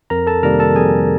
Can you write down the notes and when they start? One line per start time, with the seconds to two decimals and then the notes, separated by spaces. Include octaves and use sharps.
0.10 F2 A#4 A#5
0.27 A4 A5
0.43 C3 D#3 G3 A#3 A#4 A#5
0.60 A4 A5
0.75 F2 G#4 G#5